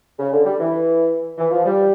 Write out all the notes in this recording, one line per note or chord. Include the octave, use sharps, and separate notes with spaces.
C#3
D3
G3
E3
E3
F3
G3